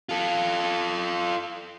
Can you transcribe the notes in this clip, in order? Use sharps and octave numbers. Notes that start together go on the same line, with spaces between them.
F4 A4